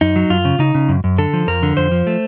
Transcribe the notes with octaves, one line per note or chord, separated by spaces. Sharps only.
F#2 D#4
F#3
F#2 F4
C#3
C#3 D#4
C#3
F#2
F#2
D3 A4
F3
F2 A#4
D3
F2 C5
F3
A3